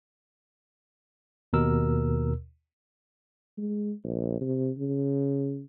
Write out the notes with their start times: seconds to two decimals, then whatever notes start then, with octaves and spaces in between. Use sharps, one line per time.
1.53 D#2 B2 A#4 E6
3.58 G#3
4.04 A#1
4.41 C3
4.78 C#3